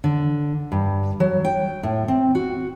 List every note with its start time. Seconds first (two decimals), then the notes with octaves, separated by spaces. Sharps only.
0.04 D3
0.72 G2
1.20 F#3
1.45 G5
1.83 A2
2.08 C4
2.35 F#4